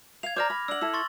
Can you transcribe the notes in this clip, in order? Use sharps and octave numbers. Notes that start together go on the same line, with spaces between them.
F5 G#6 F7
C5 D5 A#5 D6 F6 A#6
B5
D4 F#5 E6 F#7
E4 A4 E6
C6 C#6 A6